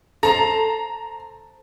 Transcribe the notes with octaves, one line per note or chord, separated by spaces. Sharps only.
A4 C5 A#5